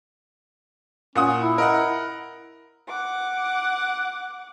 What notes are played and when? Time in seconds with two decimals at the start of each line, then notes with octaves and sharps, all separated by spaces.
1.15 A#2 C#4 F#5 D#6
1.37 E4
1.58 A#4 D#5 F#5
2.89 F#5 D6